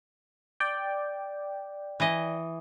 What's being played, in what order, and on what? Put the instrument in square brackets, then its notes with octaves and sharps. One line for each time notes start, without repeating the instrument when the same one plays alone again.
[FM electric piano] D5 G5
[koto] E3 D#5